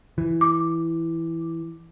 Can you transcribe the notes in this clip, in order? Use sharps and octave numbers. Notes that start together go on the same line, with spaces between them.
E3
D6